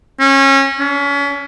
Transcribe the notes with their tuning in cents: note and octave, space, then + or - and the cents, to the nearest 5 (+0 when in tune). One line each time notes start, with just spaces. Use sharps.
C#4 -25
C#4 +35